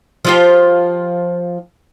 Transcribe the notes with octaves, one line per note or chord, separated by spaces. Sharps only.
F3 F4 G4